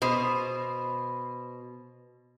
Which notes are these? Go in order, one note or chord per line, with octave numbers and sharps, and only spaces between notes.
B2 C5